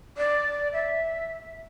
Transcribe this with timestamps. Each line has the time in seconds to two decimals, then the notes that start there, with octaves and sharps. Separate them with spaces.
0.17 D5
0.73 E5